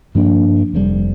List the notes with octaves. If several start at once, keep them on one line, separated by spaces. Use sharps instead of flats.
G2 F3 A#3 D4
F1 F2 C3 G3